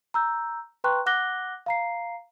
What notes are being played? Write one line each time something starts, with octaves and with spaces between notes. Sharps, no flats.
A#5 E6 G6
B4 G5 A#5 C6 C#6 F#6
F#5 D6 F#6 A#6 G7
F5 A#5 C7